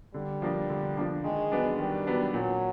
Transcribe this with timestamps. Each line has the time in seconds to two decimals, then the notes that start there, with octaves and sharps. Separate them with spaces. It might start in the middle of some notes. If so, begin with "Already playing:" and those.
0.14 D3 G3
0.42 F3 A#3 D4
0.70 D3
0.97 F3 A#3 D4
1.24 D#3 G#3
1.52 F#3 B3 D4
1.79 D#3 G3
2.07 F#3 B3 D4
2.34 A#2 F#3